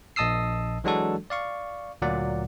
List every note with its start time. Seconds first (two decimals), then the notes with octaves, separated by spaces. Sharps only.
0.16 A#1 D#5 A5 D#6 E6 C7
0.84 E3 F#3 G#3 D4 F#4 A4
1.30 D5 F5 C#6
2.02 D2 A#2 F#3 A#3 D5 F#5